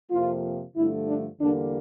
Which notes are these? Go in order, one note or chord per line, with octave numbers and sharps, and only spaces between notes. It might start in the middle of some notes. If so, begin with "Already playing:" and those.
F2 C3 F3 A#3 F4
G2 D3 F3 A3 E4
D4
E2 D3 G3 A#3 D4